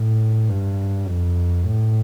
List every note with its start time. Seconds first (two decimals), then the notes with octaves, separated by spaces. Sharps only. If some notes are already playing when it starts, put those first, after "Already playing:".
Already playing: A2
0.49 G2
1.07 F2
1.65 A2